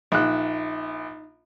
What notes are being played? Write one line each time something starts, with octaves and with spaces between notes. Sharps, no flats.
A#1 D#4 E5 F#6